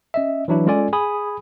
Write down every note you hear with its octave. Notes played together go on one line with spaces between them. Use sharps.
C#4 D#5 E5
E3 F#3 D4 E4 B4
G#3 C#4 F4 A4 D5 G#5
G#4 G#5 B5 D#6